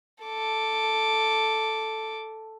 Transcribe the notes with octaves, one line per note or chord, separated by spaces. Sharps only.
A4 D6